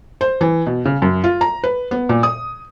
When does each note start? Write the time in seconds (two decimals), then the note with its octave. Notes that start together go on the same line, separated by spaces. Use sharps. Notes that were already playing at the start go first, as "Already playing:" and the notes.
0.21 C5
0.41 E3
0.66 B2
0.85 C#3
1.02 F#2
1.24 F4
1.41 A#5
1.64 B4
1.91 B3
2.09 A#2
2.23 D#6